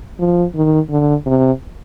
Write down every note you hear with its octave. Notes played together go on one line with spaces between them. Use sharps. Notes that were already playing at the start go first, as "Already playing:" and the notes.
F3
D#3
D3
C3